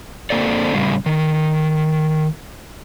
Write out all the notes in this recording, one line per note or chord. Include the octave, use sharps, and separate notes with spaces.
D3 A#3 C4 A4 D5
A2 C#3 G3
D#3